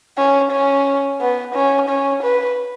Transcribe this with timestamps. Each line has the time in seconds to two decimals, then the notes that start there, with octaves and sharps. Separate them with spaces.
0.18 C#4
0.51 C#4
1.21 B3
1.55 C#4
1.89 C#4
2.23 B4